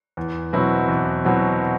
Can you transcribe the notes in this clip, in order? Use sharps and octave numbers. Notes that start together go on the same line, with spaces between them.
E2
B2 F#3 C4 E4
E2
B2 F#3 C4 E4